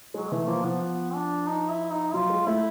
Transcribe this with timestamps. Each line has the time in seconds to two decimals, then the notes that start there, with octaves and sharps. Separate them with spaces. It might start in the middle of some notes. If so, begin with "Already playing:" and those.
0.14 F#3 G#3
0.31 E3 A3
0.47 F3 A#3
0.64 F3 B3
0.81 B3
1.14 D4
1.48 D#4
1.69 E4
1.91 D#4
2.14 F#3 F4
2.30 G#3
2.46 A3 E4